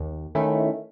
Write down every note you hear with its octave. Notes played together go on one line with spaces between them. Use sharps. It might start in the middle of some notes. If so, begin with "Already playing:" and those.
Already playing: D#2
D#3 A3 C#4 E4